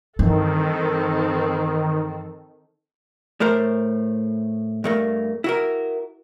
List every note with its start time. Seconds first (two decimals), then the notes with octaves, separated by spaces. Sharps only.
0.19 G2 D#3 E3 C4 A4
3.40 A2 A3 A#4 C5
4.84 G2 A3 A#3
5.44 E4 F#4 A#4